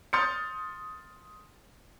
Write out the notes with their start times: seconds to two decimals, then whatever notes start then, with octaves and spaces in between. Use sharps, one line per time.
0.13 C6 D#6 F6 G6 A6 C#7